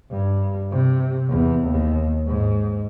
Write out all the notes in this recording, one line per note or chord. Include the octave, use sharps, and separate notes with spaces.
G2
C3
E2
D#2
G#2